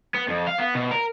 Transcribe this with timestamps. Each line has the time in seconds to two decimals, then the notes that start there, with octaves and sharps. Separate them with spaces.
0.15 B3
0.28 F2
0.47 F5
0.59 B3
0.75 B2
0.91 A#4